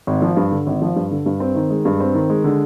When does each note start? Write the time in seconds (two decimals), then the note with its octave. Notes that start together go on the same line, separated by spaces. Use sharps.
0.07 G#1
0.22 F3
0.37 G2
0.52 D3
0.67 G#1
0.82 F3
0.96 G2
1.11 D3
1.26 G2
1.40 C4
1.55 D#3
1.70 G#3
1.85 G2
2.00 C4
2.14 D#3
2.30 G#3
2.44 D3